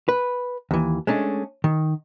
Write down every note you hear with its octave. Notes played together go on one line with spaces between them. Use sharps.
B4
D#2 E3
G#3 A3 C#4 D4
D#3